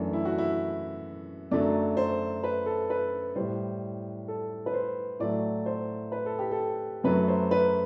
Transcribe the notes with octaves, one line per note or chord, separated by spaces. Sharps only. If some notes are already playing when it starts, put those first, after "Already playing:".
Already playing: F#2 E3 A3 D4
E4
F#4
E4
F#2 D3 F#3 A3 D5
C5
B4
A4
B4
A2 G3 C5
A4
B4
C5
A2 F#3 A3 D5
C5
B4
A4
G4
A4
F#2 F#3 A3 B4
C5
B4